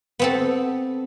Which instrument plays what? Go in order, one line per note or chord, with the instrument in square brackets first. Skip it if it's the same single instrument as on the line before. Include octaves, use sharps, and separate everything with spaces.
[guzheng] B3 C4 A4